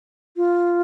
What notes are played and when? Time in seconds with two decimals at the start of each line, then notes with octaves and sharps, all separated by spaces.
0.37 F4